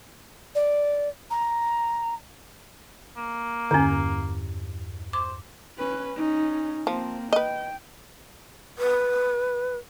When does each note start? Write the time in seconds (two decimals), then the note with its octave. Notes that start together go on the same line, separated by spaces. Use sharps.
0.55 D5
1.31 A#5
3.17 A#3
3.71 E2 G2 D3 C#4 A#5
5.13 C5 D6
5.78 C#4 B4
6.16 C#4 D#4
6.87 F3 A#3 C4
7.33 B4 D#5 G5
8.78 B4